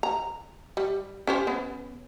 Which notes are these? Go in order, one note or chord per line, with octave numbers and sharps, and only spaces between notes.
A#5
G3
C#4 G4 C5
B3 C#4